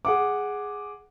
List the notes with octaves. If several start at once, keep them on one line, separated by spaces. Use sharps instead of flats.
G#4 F#5 D6